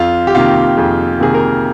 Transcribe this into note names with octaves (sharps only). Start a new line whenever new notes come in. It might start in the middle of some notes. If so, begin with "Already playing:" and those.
Already playing: F2 F4
G4
C3 D#3 A#3 F4
F2 G#4
C3 D#3 A#3 G#4
A#4